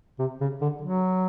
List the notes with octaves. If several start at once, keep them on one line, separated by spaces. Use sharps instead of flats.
C3
C#3
D3
F#3